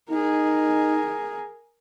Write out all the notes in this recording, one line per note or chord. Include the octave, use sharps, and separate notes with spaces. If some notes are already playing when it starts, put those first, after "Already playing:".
D#4 G#4 A#4